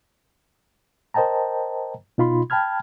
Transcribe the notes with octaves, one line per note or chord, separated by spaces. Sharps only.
A#4 C5 D#5 G5 A5 A#5
B2 D#4 F4 B5 C6
G5 A5 B5 F6 G#6